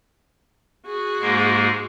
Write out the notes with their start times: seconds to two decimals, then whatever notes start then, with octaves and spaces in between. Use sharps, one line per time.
0.86 F#4 G#4
1.21 G#2 G#3 A#3